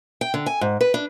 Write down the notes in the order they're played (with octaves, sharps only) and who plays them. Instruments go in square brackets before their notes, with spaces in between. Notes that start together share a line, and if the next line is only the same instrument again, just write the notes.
[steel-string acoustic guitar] G5
D3
G#5
G#2
B4
D4